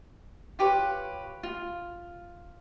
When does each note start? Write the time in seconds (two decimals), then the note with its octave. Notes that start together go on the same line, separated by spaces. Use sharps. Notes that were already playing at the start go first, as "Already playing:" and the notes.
0.59 F4 G4 B4 C#5
1.43 F4